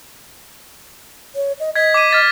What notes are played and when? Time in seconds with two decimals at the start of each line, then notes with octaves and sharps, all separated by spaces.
1.35 C#5
1.60 D#5
1.76 D#5 G#6 B6
1.94 D6 B6 D#7
2.11 F6 A6 B6